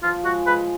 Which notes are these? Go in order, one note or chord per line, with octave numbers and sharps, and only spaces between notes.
F3 F4
G#3 F#4
G#3 B4